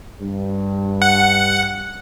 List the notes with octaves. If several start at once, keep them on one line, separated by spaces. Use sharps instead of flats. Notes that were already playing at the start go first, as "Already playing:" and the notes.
G2
F#5